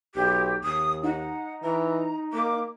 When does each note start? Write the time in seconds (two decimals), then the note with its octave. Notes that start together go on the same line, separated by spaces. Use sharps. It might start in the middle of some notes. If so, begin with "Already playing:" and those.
0.15 B1 G4
0.63 D#2 D#6
1.03 D#4 F#5
1.62 E3 A#5
2.33 A#3 D6